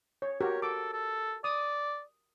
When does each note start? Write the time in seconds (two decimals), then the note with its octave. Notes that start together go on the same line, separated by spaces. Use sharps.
0.22 C#5
0.41 F#4 G4 A#4 C#5
0.62 A4 D6
0.93 A4
1.44 D5 D#6